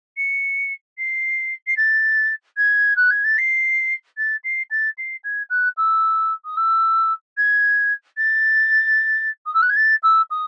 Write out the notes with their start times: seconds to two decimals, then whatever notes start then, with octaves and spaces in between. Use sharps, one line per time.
0.17 C#7
0.98 C7
1.67 C7
1.77 A6
2.57 G#6
2.96 F#6
3.10 G#6
3.24 A6
3.38 C7
4.17 A6
4.44 C7
4.70 A6
4.97 C7
5.24 G#6
5.50 F#6
5.77 E6
6.45 D#6
6.56 E6
7.37 G#6
8.17 A6
9.46 D#6
9.54 E6
9.62 F#6
9.69 G#6
9.76 A6
10.03 E6
10.30 D#6